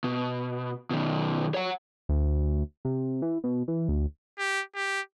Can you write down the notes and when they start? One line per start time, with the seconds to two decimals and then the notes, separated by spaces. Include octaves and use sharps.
0.04 B2
0.91 B2 D#3
1.55 C#5 F#5
2.09 D2
2.85 C3
3.22 E3
3.44 B2
3.68 E3
3.89 D2
4.39 G4
4.75 G4